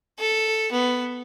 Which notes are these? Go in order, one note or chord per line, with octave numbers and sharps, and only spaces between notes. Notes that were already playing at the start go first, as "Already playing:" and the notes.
A4
B3